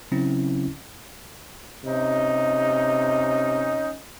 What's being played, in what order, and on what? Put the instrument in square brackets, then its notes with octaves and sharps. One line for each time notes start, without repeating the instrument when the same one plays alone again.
[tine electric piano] C#3 F#3 C4 C#4 E4
[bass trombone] C3 [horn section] C#4 D#4